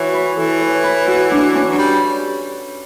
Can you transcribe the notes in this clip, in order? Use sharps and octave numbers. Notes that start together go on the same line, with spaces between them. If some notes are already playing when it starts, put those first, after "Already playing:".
Already playing: E3 E4 F#4 C#5
B4
E3 A4
C#5
B4
F#4
D4
C#4
F#3
G3